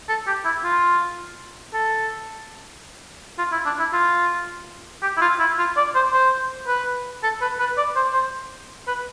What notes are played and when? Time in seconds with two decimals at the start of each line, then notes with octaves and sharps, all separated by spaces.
0.09 A4
0.27 G4
0.45 E4
0.64 F4
1.74 A4
3.38 F4
3.52 E4
3.65 D4
3.80 E4
3.93 F4
5.02 G4
5.17 E4
5.21 F4
5.39 E4
5.59 F4
5.77 D5
5.95 C5
6.13 C5
6.68 B4
7.23 A4
7.41 B4
7.60 B4
7.77 D5
7.96 C5
8.14 C5
8.87 B4